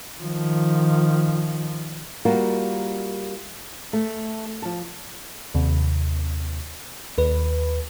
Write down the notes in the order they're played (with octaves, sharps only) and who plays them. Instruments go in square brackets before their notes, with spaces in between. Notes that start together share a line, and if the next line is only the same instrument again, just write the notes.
[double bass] D#3 F3
[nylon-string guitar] G3 A#3 F4 F#4 A#4
A3
F3 A5
[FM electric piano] D#2 C3
D#2 B4